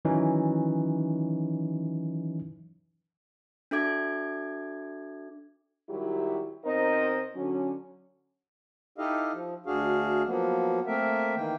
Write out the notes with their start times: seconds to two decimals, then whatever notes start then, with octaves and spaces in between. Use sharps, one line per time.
0.05 D#3 E3 F#3 C#4 D#4
3.71 D4 F#4 A4 E5 D6 G#6
5.89 D#3 F#3 G3 E4 G4
6.65 B2 C4 D#4 A#4 C5 D#5
7.35 D3 F#3 C#4
8.98 D#4 E4 G4 A4 D#5 F5
9.33 F3
9.66 D2 D4 F#4 G#4 F5
10.27 F3 F#3 A#3 B3
10.87 A3 A#3 C4 A#4 E5
11.36 D#3 E3 A#3 G5